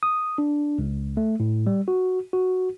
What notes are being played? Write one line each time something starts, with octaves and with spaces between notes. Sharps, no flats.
D#6
D4
C#2
A3
A2
G3
F#4
F#4